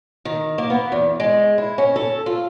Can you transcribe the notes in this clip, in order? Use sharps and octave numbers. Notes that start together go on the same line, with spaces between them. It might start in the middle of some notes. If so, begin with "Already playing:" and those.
D#3
A#3
B3
E2
G#3
E4
C#4
A4
F4